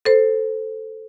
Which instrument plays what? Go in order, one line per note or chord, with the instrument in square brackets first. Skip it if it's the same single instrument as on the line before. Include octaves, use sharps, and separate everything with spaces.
[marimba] A4 C5